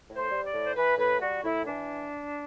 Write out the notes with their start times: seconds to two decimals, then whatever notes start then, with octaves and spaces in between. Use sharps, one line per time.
0.09 A2
0.16 C5
0.31 G3
0.45 D5
0.53 A2
0.66 C5
0.76 E3 B4
0.98 A2 B4
1.21 G3 F#4
1.43 A2 E4
1.65 E3 D4